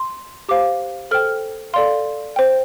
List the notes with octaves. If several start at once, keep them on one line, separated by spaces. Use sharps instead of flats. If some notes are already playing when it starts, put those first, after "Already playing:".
Already playing: C6
G4 C5 F5 D6
A4 C5 G5 F6
A4 D5 F5 C6
C5 G5